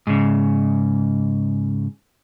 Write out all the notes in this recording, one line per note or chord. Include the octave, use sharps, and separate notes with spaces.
G#2 C#3